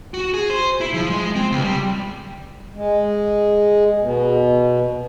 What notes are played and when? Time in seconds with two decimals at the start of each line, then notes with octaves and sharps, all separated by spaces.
0.14 F#4
0.34 G#4
0.50 C5
0.81 E4
0.94 F3
1.10 G#3
1.36 C4
1.52 C#2
1.64 G3
2.75 G#3
3.99 B2